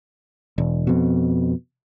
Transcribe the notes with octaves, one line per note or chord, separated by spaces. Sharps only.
E1
F2 B2